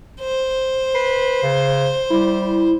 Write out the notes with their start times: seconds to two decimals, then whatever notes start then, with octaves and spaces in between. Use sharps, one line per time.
0.20 C5
0.95 B4 C7
1.43 C#3
2.10 G3 E4